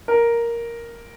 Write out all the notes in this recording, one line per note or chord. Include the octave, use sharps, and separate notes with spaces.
A#4